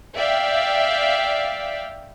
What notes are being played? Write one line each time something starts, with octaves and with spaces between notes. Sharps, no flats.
D5 E5 F5 G5